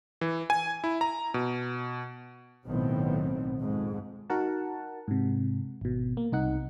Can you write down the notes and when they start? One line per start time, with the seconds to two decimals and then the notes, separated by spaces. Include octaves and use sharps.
0.21 E3
0.50 G#5
0.84 E4
1.01 A#5
1.34 B2
2.66 B1 A2 D#3 B3 C4
3.59 F2 G#2
4.30 D#4 F#4 A#4 F#5 A5
5.08 G#2 C3
5.81 G#1 B2
6.17 A#3
6.32 C2 D#4 F#5